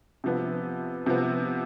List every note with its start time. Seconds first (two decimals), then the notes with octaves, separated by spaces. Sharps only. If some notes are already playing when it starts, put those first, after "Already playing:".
0.24 C3 F3 B3
1.06 C3 F3 B3